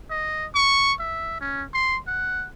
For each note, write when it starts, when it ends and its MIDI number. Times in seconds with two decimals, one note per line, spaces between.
0.11 0.46 75
0.55 0.93 85
1.00 1.37 76
1.41 1.64 61
1.74 1.99 84
2.07 2.47 78